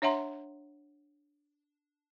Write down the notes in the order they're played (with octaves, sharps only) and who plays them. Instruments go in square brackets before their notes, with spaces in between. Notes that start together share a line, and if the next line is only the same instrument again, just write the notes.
[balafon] D4 C#5 E5 F#5 A#5 C6